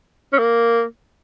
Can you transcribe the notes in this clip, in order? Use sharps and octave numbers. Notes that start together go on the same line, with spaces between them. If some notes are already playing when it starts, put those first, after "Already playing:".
C#4
A#3